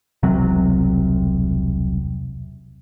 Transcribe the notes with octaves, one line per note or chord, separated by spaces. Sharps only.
E1 C2 C3 F#3